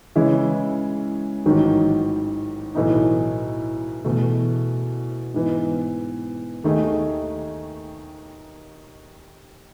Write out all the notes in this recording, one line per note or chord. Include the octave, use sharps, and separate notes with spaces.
C#3 E3 G#3 C#4 E4
A1 G#2 D#3 F#3
B1 A2 E3 A3 D#4
E2 B2 A3
G#2 E3 B3
D#2 D#3 A3 D#4 G#4